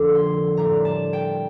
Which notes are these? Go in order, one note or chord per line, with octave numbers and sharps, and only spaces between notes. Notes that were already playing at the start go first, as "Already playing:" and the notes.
Already playing: F2 D3 F3 A#3 D6
C6
A2 G3 A#3 A#5
A5
G5